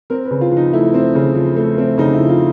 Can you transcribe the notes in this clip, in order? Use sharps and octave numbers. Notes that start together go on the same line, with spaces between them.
C4 A#4
B4
C#3
F4
F3
D#4
A3 E4
C4
C#3
F3
A3
C4
C#3 D#4
E4
F3
F4